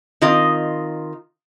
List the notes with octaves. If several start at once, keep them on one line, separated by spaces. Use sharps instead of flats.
D#3 C4 F4 D#5